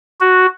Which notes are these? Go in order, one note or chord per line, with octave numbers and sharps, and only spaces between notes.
F#4